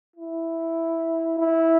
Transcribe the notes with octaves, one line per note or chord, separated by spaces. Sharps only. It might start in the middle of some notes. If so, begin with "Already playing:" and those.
E4
E4